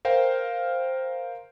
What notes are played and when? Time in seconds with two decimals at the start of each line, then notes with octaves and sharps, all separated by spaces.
0.05 A#4 C5 F5 G5